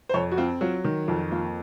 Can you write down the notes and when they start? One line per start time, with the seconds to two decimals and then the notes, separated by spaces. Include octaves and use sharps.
0.09 C5
0.14 F2 C#5
0.32 F#4
0.37 C4 F4
0.61 F#3 F4
0.84 D#3
1.08 F2 F4
1.31 A#3 F4